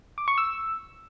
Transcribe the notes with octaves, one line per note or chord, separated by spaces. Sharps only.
D6
C#6
E6